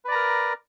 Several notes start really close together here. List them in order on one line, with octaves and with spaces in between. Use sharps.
B4 D5 A#5 A#4